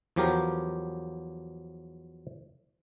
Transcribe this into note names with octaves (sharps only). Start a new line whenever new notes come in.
E2 F3 F#3 G4 A#4